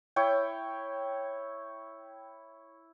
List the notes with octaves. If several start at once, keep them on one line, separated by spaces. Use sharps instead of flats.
E4 C#5 G5